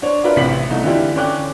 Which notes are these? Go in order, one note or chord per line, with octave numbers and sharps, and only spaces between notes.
D4 C5 C#5
D4 E4 F4 A#4 B4
A1 C3 B6 F#7
C2 A3 D#4
D3 E3 E4 F4 G4
D3 C#4 G5 D6 F#6